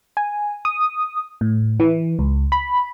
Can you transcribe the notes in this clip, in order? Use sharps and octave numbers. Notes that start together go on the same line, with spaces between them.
G#5
D#6
A2
E3
C#2
B5